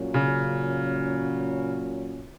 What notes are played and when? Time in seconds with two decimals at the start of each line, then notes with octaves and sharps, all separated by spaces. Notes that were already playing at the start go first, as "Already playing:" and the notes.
Already playing: A#2 F#3 C#4
0.14 C#3